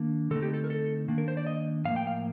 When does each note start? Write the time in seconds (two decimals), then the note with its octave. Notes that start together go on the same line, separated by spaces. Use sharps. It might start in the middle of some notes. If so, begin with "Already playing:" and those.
Already playing: D#3 A#3 D4
0.31 D3 A3 C4 D#4 A4
0.42 G4
0.54 A4
0.64 A#4
0.70 A4
1.08 D#3 A#3 D4
1.18 A#4
1.28 C5
1.37 D5
1.47 D#5
1.85 A2 F3 A#3 F5
1.96 G5
2.07 F5